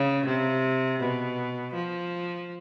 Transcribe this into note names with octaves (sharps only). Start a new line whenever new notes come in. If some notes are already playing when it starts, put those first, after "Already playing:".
Already playing: C#3
C3
B2
F3